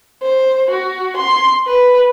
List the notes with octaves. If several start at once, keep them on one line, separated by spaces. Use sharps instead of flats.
C5
F#4
C6
B4